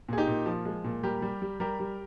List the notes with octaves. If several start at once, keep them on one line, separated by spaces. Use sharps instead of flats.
A#2 G#4
D#4 G4
A#2
F3
G#3
A#2
G3 G4 A#4
G3
G3
G3 G4 A#4
G3